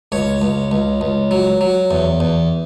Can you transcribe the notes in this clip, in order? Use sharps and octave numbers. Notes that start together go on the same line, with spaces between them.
C#2 C#5
C#2
C#2
C#2
F#3
F#3
E2
E2